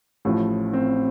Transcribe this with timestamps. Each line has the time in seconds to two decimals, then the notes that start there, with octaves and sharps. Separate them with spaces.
0.25 A1 A2 F3
0.73 C4